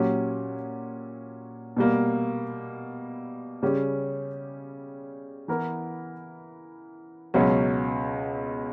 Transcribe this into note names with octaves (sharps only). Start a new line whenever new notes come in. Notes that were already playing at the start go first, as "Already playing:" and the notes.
Already playing: A#2 F#3 C#4 G4
B2 G3 A#3
C#3 G3 C#4 G4
E3 B3 E4 A#4
C#2 B2 F#3 C#4